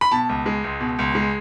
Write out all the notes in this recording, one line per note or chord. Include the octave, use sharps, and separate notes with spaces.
B5
B2 A5
C#2
G#3
C#2
B2
C#2
G#3